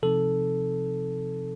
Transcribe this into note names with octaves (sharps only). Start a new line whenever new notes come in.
C3 F3 C4 D#4 A4